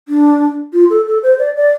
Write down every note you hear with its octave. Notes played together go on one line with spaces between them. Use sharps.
D4
F4
A4
A4
C5
D5
D5